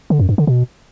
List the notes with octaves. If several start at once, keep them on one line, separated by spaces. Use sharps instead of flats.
D3
F#2
G2
D3
B2